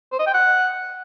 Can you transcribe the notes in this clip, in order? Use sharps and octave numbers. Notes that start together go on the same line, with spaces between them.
C5
D#5
G5
F#5